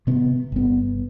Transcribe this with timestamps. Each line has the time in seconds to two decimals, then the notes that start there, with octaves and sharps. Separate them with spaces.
0.07 C3 B3
0.52 G1 B3